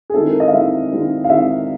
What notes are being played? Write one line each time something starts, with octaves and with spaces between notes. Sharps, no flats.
G#4
D#3 G#3 C4 E4 A4
A#4
D#5
F5
D#3 G#3 C4 E4 E5
D#3 G#3 C4 E4
F5
D#3 G#3 C4 E4 E5